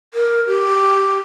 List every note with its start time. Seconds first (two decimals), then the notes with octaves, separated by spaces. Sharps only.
0.14 A#4
0.47 G4